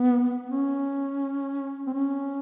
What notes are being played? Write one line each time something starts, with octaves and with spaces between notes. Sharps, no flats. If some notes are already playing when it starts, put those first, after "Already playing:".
Already playing: B3
C#4
C4
C#4